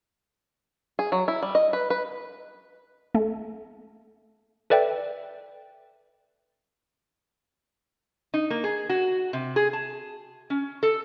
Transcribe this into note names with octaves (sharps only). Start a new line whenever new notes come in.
G#4
F#3
E4
G3
D#5
B4
B4
A3
A4 B4 D5 E5 G5
D#4
A#3
G#4
F#4
C3
G#4
A5
C#4
A4